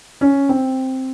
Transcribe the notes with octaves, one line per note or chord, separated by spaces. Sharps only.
C#4
C4